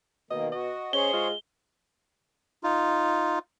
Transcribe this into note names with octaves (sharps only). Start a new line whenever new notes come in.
B2 D#3 A#3 D#5
F#4 D#5
C#4 G#4 C5 C#5 G7
G#3 F4
D#4 F4